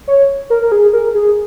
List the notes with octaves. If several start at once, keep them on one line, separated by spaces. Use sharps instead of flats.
C#5
A#4
A#4
G#4
A#4
G#4